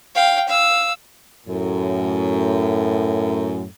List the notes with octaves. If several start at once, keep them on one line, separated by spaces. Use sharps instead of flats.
F5 G5
F5 E6
F#2 A2